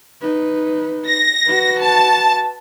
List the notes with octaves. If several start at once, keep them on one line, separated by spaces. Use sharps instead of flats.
D#4 B4
A#6
F#4 B4
A5